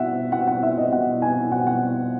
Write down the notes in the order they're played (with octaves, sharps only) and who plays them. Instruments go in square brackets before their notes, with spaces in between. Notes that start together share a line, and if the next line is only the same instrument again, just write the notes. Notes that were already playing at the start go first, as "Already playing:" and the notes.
Already playing: [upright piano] B2 E5 F#5
B2 F#5
F#5
E5
D#5
B2 F#5
G#5
B2 F#5
F#5